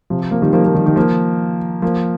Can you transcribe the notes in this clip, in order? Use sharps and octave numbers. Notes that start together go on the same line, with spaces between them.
C3 F3
F3 A#3
D#3 G3
F3 A#3
F3 A#3
D#3 G3
D#3 G3
F3 A#3
F3 A#3